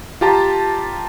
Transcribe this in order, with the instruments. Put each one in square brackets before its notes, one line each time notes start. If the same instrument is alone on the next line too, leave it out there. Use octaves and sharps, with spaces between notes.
[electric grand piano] F4 G4 A5 A#5